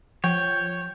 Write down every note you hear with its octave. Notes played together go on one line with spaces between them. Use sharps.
F3 C#5 G5